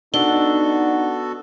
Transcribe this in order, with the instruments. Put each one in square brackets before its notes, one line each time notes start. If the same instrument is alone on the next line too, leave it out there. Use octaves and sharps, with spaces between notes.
[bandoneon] B3 F#4 A4 [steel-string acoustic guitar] D4 [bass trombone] D#4 [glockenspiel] G7